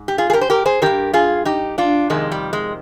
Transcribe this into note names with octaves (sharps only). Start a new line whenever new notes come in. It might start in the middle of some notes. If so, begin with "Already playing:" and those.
Already playing: G#2
G4
F4 G#4
G#4
G4 A#4
C5
G4 A#4
G#4 C5
G2 D#3 G4 A#4
F4 G#4
D#4 G4
D4 F4
F2 C3 D#3 G#3
G3
G#3